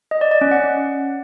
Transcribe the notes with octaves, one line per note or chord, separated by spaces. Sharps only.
D#5
D5
D5
C#4
F#5